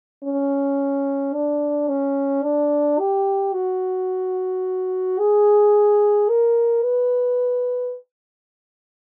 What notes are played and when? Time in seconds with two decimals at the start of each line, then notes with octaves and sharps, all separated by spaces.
0.23 C#4
1.33 D4
1.89 C#4
2.43 D4
2.99 G4
3.53 F#4
5.19 G#4
6.29 A#4
6.84 B4